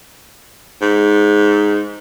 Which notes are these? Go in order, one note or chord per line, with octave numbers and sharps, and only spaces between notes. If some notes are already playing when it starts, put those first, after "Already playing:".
G#2